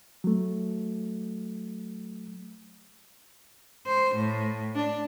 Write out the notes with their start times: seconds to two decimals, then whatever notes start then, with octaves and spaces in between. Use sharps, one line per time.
0.24 F#3 A3
3.86 C5
4.16 A2
4.76 D4